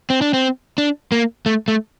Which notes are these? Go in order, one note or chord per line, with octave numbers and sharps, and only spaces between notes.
C4
D4
C4
D4
A#3
A3
A3